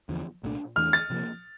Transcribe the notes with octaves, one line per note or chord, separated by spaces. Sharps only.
E2 D3 F3
C2 A#2 A3 D4
E2 E3 A3 D4 F6
A6
C3 F3 A#3